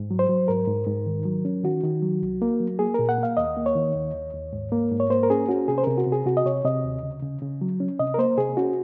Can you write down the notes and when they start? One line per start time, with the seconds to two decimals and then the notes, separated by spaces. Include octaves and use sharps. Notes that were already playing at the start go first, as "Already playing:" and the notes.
Already playing: G#2
0.11 F#3
0.19 C5
0.29 F#3
0.48 G#2 A#4
0.68 G#2
0.87 G#2
1.06 D#3
1.25 F#3
1.45 C#4
1.64 D#3 F#4
1.84 D#3
2.02 F#3
2.22 C2
2.42 A#3
2.60 F#3
2.79 A#3 G#4
2.94 A#2 A#4
3.09 F#5
3.18 A#3 F5
3.37 D#2 D#5
3.57 A#3
3.66 C#5
3.75 D#3
3.95 D#2
4.15 D#2
4.33 D#2
4.53 G#2
4.72 A#3
4.92 G#2
5.00 C#5
5.10 A#3 C5
5.23 A#4
5.30 C#4 G#4
5.49 C#4 F#4
5.68 C3 G#4
5.78 C5
5.83 C3 A#4
5.98 F#4
6.07 C3
6.12 G#4
6.26 C3 F#4
6.37 D#5
6.45 C3 C#5
6.65 C3 D#5
6.84 D#2
7.03 C#3
7.23 C#3
7.42 C#3
7.61 F#3
7.80 C#4
7.99 C3 D#5
8.14 A#4
8.18 A#3 C5
8.38 C3 G#4
8.57 C#4 F#4